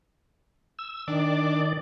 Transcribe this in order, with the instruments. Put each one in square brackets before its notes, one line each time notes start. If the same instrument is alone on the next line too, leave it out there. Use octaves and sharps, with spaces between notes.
[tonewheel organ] E6
[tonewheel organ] D#3 D5 [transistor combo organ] D4